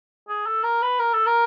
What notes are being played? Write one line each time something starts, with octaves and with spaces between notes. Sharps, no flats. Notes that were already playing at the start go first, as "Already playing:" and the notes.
G#4
A4
A#4
B4
A#4
A4
A#4